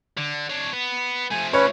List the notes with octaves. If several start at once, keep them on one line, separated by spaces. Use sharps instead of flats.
D3
D4 C#5
B3
F3 A3 G#5
C#4 B4 C#5